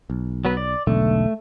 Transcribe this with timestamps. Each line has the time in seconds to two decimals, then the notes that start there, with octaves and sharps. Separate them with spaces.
0.10 B1
0.45 F#3 B3 B4
0.57 D5
0.87 E1 B1 D3 A3